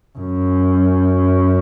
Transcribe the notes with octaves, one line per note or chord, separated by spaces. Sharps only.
F#2